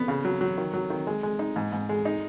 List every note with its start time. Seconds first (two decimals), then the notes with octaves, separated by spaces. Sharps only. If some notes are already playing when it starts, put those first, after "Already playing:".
Already playing: B3
0.08 C#3
0.25 F#3
0.41 F#3
0.58 D#3
0.74 F#3
0.90 D#3
1.07 G#3
1.23 G#3
1.39 D#4
1.56 G#2
1.72 G#2
1.89 G#3
2.05 D#4